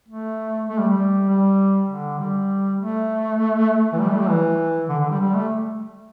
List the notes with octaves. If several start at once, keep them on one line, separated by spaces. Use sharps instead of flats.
A3
A3
G3
G3
G3
D3
G3
A3
E3
G3
A3
G3
E3
D3
D3
G3
G3
A3